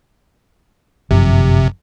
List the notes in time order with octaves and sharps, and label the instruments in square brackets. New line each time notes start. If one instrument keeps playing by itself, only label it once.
[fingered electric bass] G1 F#2 F3 [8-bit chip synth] C3